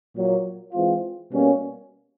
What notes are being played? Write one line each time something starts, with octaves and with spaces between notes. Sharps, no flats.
A#2 F#3 A#3
E3 G#3 C4 F4
B2 G3 A#3 C#4